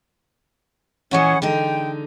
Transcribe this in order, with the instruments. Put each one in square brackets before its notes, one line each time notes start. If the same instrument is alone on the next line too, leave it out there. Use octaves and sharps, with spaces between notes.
[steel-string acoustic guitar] A#2 E3 G#3 [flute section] C#4 G#4 F#5
[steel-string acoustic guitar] D3 G#3 D#4 [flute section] G5